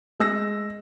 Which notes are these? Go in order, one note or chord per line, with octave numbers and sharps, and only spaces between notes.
G#3 E6 A#6